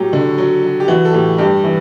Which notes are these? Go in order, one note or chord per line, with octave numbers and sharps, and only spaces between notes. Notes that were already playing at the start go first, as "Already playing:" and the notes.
Already playing: A2 F#3 G4
D3
F#3
F#3
G4
E3 F#4
A4
A2 G4
G2 G4
E3